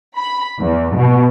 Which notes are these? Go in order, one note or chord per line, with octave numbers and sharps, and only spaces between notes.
B5
E2
B2